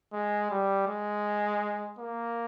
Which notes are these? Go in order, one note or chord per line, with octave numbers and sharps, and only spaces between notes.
G#3
G3
G#3
A#3